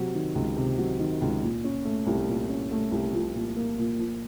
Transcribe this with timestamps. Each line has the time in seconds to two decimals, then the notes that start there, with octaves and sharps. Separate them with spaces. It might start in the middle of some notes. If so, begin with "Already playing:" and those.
Already playing: C3 F#3
0.14 D#3
0.35 C#2
0.56 C3
0.78 F#3
0.99 D#3
1.21 C#2
1.42 A#2
1.64 C#4
1.85 A3
2.07 C2
2.27 A#2
2.49 C#4
2.71 A3
2.92 C2
3.13 F3
3.35 A#2
3.56 A#3
3.78 A#2
3.99 F3